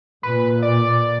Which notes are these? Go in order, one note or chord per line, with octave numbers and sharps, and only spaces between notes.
A#2 B4
D5